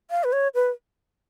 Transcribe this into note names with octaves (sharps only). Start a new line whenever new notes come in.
F5
B4
C#5
B4